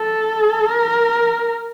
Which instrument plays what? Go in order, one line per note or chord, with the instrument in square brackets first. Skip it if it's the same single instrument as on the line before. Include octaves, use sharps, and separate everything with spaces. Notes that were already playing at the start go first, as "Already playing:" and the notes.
Already playing: [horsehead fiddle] A4
A#4